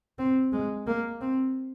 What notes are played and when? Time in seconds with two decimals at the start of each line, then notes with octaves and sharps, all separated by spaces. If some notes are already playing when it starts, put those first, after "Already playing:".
0.19 C4
0.52 G#3
0.87 A#3
1.21 C4